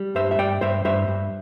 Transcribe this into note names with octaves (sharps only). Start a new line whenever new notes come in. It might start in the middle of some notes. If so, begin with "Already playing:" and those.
Already playing: G3
G2 C5 E5
E5
G2 D5 G5
G2 C5 E5
G2 C5 E5
G2